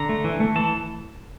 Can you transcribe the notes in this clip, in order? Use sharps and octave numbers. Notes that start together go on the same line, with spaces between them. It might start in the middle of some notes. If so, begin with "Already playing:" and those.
Already playing: D3 A#5
A3
E3
A3
E3 A5